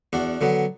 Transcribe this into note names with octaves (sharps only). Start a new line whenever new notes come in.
E2 D4 F#4
D3 F#3 B3